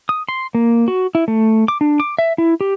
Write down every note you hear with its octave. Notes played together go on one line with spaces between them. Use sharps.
D#6
C6
A#3
F#4
E4
A3
D6
D4
D6
E5
E4
G4